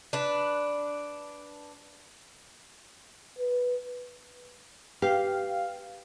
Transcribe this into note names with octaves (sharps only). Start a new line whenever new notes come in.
D4 B4
B4
G4 B4 F5 G5